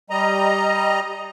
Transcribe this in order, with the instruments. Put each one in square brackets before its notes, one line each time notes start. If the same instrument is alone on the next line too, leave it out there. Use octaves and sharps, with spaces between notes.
[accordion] G3 D#5 A#5